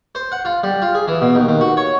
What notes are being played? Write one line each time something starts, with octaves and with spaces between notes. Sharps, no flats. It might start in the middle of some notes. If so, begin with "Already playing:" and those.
C5
F#5
F4
G3
F4
G#4
E3
B2
D#2
D#2
F#4
C#5